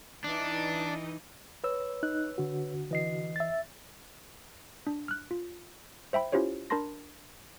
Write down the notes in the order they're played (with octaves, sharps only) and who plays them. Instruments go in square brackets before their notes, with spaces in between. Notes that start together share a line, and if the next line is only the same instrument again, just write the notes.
[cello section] E3 D#4 [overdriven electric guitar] D4
[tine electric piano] B4 C#5 E6
[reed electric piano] D#4 F#6
D3 F#4
[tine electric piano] E3 D#5 C7
[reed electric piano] E5 A6
[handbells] D4
F6 F#6
F4
C5 E5 G5 B5
C#4 E4 F4 G4 C5 C#5
D4 A#4 A5 B5 C6 A#6